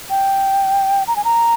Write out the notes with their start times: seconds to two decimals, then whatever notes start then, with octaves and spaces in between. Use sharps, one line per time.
0.10 G5
1.07 A#5
1.16 G#5
1.24 A#5